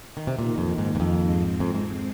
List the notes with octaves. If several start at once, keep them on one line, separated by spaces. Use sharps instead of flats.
D#3
C3
A#2 D#3 A#3 D#4
F2
G#2
G#2
F2
G#2 G#3 C4
F2
G#2